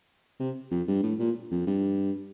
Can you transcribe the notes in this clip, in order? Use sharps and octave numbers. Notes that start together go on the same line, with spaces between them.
C3
F2
G2
A2
A#2
F2
G2